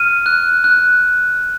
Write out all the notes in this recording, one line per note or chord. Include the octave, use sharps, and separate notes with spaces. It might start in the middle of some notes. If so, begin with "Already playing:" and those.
Already playing: F6 D#7
F#6
F#6